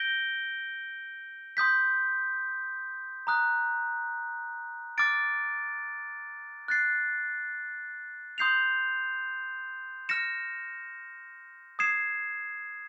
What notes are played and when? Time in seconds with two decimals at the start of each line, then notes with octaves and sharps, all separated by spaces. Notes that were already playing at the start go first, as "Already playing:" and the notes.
Already playing: G6 A#6 D7 G7
1.57 C6 D#6 G6 B6
3.27 A#5 D#6 F#6
4.98 D6 F6 A6 D7
6.68 F#6 A6 C7
8.38 C6 D#6 G6 C7 F7
10.09 F6 A#6 C#7 E7
11.79 D#6 G#6 C7 E7